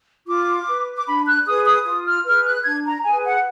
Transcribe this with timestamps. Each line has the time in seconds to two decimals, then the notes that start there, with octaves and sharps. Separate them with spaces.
0.27 F4 D6
0.67 B4
0.97 D6
1.07 D4 B5
1.26 F#6
1.46 G#4 B4 D#6
1.66 D#6
1.85 F4 D#6
2.06 F6
2.25 G#4 B4 F6
2.46 F#6
2.65 D4 G#6
2.86 A#5
3.04 G#4 B4 G#5
3.25 F#5